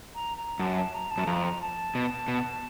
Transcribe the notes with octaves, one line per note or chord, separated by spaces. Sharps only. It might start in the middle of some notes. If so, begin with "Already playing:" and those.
A#5
A#5
F#2 A5
A5
A#5
A5
F#2
F2 A#5
A5
B2
B2